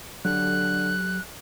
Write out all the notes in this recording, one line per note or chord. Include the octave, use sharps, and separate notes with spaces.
D3 F#3 G4 A4 F#6